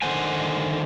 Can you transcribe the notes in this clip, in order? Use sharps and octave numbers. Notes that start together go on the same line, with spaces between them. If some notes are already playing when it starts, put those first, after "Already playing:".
D3 D#3 C5 F#5 G#5